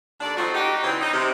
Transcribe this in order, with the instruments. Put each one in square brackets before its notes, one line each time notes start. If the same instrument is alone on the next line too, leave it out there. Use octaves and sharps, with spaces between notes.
[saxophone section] D#2 D4 A4 D5
F3 A3 C4 D#4 F4 F#4
D#4 F#4 G4
C#3 E3 G3 C4
D#4
C3